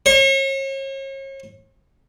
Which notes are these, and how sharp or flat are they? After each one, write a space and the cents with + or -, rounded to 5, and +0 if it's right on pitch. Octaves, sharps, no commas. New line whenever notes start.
C#5 -40